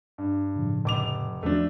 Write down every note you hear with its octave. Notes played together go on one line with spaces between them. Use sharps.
G2
A2 C#3 F3
F1 D6 F7
E2 F3 A3 D4 F#4